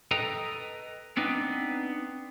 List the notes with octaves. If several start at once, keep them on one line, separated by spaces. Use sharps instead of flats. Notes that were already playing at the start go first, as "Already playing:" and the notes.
A4 B4 D#5 G5 A#5
B3 C4 D4 D#4 B4